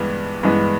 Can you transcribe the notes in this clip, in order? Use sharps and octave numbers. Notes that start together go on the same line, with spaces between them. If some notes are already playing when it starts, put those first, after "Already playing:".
Already playing: G2 E3 G#3 B3
G2 E3 G#3 B3